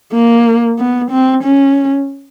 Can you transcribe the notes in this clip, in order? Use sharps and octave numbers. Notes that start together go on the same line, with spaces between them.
A#3
B3
C4
C#4